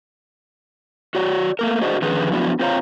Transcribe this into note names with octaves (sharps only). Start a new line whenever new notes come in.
F#4 C#5 D5
A3 A#3 A#4
D4 F#4 G#4 C5 D#5
D3 D#3 F3 C#4 G#4 B4
F3 F#3 B3 D4 E4 F#4
C4 F4 C5 C#5 F5 A#5